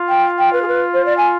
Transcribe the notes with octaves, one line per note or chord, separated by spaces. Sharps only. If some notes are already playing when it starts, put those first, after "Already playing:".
Already playing: F4
G5
G5
B4
G#4
B4
C5
D5
G#5